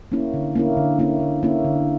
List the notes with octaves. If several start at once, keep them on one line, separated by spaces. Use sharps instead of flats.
A#3 C#4 E4
D3
A#3 C#4 E4
D3
A#3 C#4 E4
D3
A#3 C#4 E4
D3